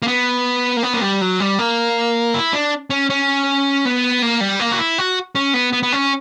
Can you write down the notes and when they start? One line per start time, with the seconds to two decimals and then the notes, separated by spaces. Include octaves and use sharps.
0.02 A#3
0.08 B3
0.77 A#3
0.83 B3
0.94 A#3
1.02 G3
1.21 F#3
1.40 G3
1.59 A#3
2.34 E4
2.53 D4
2.90 C#4
3.10 C#4
3.85 B3
4.22 A#3
4.41 G3
4.60 A#3
4.72 F#4
4.78 E4
4.98 F#4
5.35 C#4
5.54 B3
5.73 B3
5.83 B3
5.92 C#4